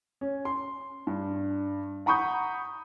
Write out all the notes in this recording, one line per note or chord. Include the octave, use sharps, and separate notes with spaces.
C#4
C6
G2
F#5 A#5 B5 C#6 D#6 G6